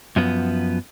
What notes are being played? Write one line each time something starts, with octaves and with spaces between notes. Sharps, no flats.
F#2 F3 B3